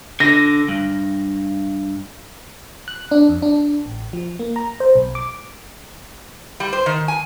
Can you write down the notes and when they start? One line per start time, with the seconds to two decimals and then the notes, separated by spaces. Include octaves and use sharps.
0.20 D3 A#6
0.68 G2
2.88 F#6
3.11 D4
3.29 F2
3.42 D4
3.86 A1
4.13 F3
4.39 A#3
4.56 A#5
4.80 C5
4.95 B1
5.15 D6
6.60 G3
6.73 C5
6.86 D#3
7.08 G#5